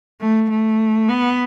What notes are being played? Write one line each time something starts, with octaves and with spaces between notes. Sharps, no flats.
A3
A3
B3